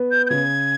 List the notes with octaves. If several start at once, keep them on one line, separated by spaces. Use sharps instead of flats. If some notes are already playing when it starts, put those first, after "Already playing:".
Already playing: B3
G6
G6
C#3 G#6